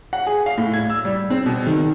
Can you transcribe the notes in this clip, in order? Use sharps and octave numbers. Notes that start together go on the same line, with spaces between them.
F#5
G#4
F5
A2
G#6
E6
G3
C4
B2
D#3